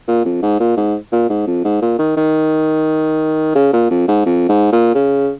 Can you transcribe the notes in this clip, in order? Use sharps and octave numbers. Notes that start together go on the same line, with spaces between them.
A#2
F2
G#2
A#2
G#2
A#2
G#2
F2
G#2
A#2
D#3
D#3
C#3
A#2
F2
G#2
F2
G#2
A#2
C#3